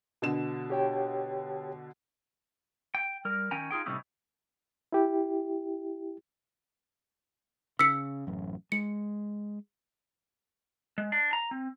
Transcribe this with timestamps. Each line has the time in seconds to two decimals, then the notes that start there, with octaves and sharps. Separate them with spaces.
0.22 B2 D3 E7
0.70 G4 C#5 G5
2.95 G5
3.25 G3 A#4
3.51 D#3 C#4 G5 G#5 A#5
3.71 D#4 F4 G#4 G5
3.86 A2 C3 G3 C#4 D#4 E4
4.92 E4 G4
7.79 C#3 E6 B6 C#7
8.27 A1 F#2
8.72 G#3 C#7
10.98 G#3
11.12 D4
11.33 A#5
11.51 C4